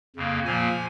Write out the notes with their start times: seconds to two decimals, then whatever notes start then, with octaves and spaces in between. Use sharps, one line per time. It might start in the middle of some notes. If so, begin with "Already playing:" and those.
0.16 F2 C#3 A#3
0.45 A#2 F3 A#3 G#5